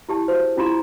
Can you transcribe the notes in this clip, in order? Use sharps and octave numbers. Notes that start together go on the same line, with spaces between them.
E4 G4 A5
F#4 C5
C#4 E4 F4 G4 A#5 C6